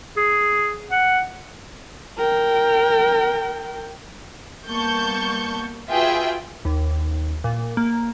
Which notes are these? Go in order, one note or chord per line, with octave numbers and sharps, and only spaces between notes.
G#4
F#5
A#4 G5
G3 A#3 B3 A5 C#6 G6
F4 F#4 G#4 B4 E5 G5
D#2
A#2
A#3